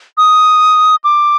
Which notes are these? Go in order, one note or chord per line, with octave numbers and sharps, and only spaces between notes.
D#6
D6